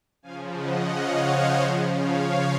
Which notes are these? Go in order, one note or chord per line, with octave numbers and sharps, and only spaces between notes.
C#3 F3 F5 G#5
D#5 F#5
C#5 F5
C5 D#5
C#3
F3
C#5 F5